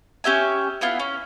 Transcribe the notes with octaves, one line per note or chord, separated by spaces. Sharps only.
C#4 G4 E5 G#5
B3 E4 F4
C#4